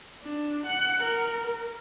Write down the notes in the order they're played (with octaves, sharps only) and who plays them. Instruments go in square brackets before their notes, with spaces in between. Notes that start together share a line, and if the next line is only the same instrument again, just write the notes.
[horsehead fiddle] D4
F#5
A#4